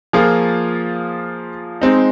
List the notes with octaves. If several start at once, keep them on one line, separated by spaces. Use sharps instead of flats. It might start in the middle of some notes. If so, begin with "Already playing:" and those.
F3 A#3 F4 G#4
G#3 C4 D#4